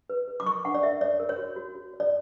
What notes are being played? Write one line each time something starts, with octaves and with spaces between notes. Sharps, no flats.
B4
B4
D6
A#4 C#6
D4 F#5
D5
A#4 E5
C#5 D5
A#4
C#5
F#4
F#4
F#4
C#5
D5